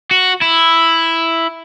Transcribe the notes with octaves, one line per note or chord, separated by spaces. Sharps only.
F#4
E4